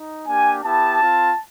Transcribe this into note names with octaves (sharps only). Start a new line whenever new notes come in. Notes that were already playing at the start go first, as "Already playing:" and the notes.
Already playing: D#4
A#3 D4 G4 G#5
B3 E4 G4 A5
C4 F4